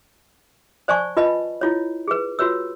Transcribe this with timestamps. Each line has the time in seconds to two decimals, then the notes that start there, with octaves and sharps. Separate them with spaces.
0.88 C5 D5 G#5 A5 C#6
1.17 F4 B4 D#5 A5 B5
1.61 E4 F4 C#5
2.08 G#4 B4
2.39 F4 F#4 B4 C#5 E6